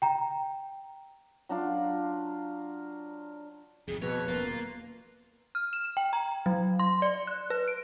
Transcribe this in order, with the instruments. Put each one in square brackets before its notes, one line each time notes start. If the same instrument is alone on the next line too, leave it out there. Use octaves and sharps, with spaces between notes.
[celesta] G5 A#5
[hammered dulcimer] F#3 D4 F4
[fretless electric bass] G#1 F2 [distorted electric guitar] C3 A3 [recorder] G#4
[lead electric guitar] F2 [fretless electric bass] B2 [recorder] B4 [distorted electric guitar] C#5
[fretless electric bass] D#1 F#2 B3 [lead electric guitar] A#3 [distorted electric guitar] F4
[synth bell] F6
E7
G5
A#5
F#3
C6
D5
F#6
B4
D7